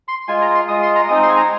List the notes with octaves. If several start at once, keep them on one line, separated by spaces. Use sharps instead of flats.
C6
G#3 F4 G#5
A#5
C6
G#3 F4 D#6
C6
A#5
G#3 C4 D#4 D#6
C6
G#5
A#5